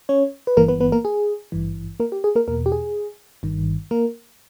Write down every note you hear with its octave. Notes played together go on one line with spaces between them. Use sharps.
C#4 C#5
B4
G1 G2 E3 A#3 A#4
B3 B4
B3 B4
A#3 A#4
G#4
G#1 G2 E3
A#3 A#4
G4
G#4
A#3 A#4
E2 B2 A#3 A#4
G4
G#4
G1 G2 D#3
A#3 A#4